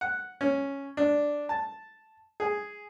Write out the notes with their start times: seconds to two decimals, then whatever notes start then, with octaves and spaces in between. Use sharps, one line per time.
0.01 F#5
0.41 C#4
0.97 D4
1.49 A5
2.40 G#4